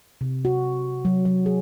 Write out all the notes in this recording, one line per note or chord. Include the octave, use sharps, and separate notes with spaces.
C3
F#4
F#3
F#3
G#4